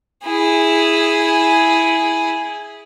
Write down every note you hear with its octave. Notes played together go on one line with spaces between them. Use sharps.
E4 G#4